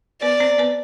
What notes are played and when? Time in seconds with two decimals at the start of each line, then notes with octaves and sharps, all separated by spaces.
0.22 B3 B4 D5
0.40 C4 C5
0.58 B3 B4